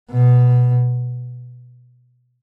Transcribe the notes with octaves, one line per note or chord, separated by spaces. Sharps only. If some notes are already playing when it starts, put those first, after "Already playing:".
B2